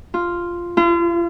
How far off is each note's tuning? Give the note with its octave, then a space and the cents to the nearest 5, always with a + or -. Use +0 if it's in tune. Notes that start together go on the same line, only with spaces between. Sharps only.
F4 -5
F4 -40